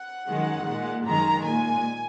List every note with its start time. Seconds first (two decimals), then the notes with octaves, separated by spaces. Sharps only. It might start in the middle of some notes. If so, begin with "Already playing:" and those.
Already playing: F#5
0.28 F#2 D#3 G#3
0.67 A#2 G#3
1.06 F#2 D#3 G#3 A#5
1.46 A#2 G#3 G#5